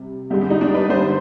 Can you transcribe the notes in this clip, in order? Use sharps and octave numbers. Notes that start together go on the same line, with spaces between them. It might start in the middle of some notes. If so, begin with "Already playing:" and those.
Already playing: C3 G3
G2 D3 G#3 G4
G4
D#4
D4
B4
G2 D3 G3 C5